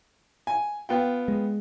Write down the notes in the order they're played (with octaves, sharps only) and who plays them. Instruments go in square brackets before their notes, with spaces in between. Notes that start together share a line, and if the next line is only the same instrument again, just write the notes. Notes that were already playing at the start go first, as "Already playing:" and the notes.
[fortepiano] G#5
B3 F4 G5
[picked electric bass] G#3